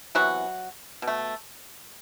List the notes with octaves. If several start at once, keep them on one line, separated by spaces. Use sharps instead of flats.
C3 E3 F#3 B3 F#4
B2
A3